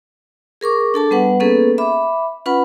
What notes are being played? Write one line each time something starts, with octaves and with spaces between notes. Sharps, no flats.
G#4 A#4 C#6 D6
D4 A4 A5 D6
G3 B3 B4 F#5
A#3 B3 C#4 G#4 A4 B4
E5 B5 D6
C#4 F4 B4 F#5 B5